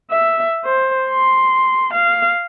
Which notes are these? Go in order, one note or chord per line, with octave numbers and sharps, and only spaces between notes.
E5
C5
C6
F5